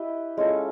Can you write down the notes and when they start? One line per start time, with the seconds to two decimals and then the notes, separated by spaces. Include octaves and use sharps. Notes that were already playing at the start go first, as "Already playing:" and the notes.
Already playing: E4 G4 B4 D#5
0.37 G#3 C#4 F4 A4